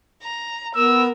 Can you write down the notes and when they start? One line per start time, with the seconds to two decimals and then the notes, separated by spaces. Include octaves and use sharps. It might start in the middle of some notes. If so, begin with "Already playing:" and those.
0.23 A#5
0.75 B3 A#4 E6